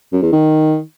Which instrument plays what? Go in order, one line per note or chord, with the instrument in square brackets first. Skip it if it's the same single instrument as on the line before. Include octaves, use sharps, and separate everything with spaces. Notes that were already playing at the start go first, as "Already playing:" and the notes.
[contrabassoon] F#2
E2
D#3